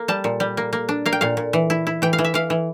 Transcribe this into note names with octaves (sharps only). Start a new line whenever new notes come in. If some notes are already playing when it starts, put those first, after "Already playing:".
Already playing: A#3
G3 A5
A#2
G3
A#3
A#3
D4
A#3 F5
G5
A#2 F5
A#2
E3
E4
E4
E3 G5
F5
E3
E5
E3 F5
E3